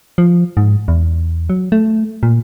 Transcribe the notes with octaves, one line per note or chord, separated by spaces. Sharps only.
F3
G#2
E2
F#3
A3
A#2